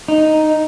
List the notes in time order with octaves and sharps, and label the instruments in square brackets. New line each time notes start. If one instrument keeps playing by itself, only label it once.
[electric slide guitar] D#4